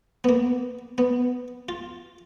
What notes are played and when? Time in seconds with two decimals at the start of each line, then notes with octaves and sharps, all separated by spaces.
0.24 B3
0.29 A#3
0.98 B3
1.69 F4